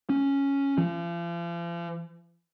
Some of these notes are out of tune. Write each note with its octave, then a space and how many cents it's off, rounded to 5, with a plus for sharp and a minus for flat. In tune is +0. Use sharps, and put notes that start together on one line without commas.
C#4 +0
F3 -40